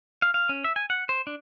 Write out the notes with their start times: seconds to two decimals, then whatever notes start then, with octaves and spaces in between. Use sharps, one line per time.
0.22 F5
0.34 F5
0.49 C#4
0.64 E5
0.76 G#5
0.90 F#5
1.09 C5
1.27 D4